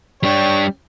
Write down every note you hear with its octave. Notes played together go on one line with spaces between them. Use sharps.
G3 D4 C#5 G5